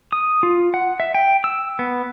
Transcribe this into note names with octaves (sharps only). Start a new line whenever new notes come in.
D#6
F4
F#5
E5
G5
E6
B3